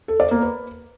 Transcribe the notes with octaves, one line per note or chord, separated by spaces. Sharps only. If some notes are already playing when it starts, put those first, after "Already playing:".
A4
D5
A#3
B4